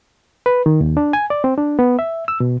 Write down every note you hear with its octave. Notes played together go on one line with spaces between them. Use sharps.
B4
D#3
D#2
D4
G#5
D5
C4
D4
B3
E5
E6
B2